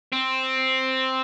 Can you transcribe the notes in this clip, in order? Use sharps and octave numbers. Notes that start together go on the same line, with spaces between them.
C4